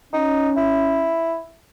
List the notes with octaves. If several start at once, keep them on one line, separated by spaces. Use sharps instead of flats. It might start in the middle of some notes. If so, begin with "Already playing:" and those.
C#4 D#4
E4